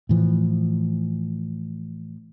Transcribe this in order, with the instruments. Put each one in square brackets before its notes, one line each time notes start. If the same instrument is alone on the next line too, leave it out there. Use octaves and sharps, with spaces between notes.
[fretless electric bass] A2 E3 F3